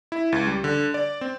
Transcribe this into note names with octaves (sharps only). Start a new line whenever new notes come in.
E4
C#2
G3
D3
D5
C4